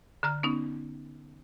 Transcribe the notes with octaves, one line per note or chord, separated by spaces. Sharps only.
D3 A#5 F6
B3 C#4 D#4